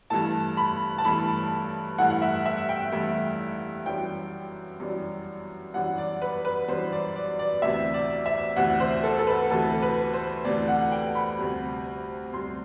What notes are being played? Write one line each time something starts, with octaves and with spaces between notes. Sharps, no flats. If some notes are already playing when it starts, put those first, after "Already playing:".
G2 E3 A3 E4 A5
B5
A5
G2 E3 A3 E4 B5
G2 E3 A3 E4 F#5
F#5
E5
E5
G5
G2 E3 A3 E4
F#2 E3 G3 D4 G5
F#2 E3 G3 D4
F#2 E3 G3 D4 F#5
D5
B4
B4
F#2 E3 G3 D4 C5
D5
D5
D5
D2 C3 E3 E5
D5
E5
D2 C3 E3 F#5
C5
A4
A4
B4
D2 C3 E3 A4
B4
C5
D2 C3 E3 D5
F#5
G5
B5
D2 C3 G3
D2 C3 G3 C6